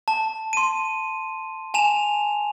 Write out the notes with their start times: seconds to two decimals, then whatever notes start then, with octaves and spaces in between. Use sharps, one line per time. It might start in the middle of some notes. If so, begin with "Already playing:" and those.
0.08 A5
0.53 C6 D#7
1.74 G#5 A5 E7 F7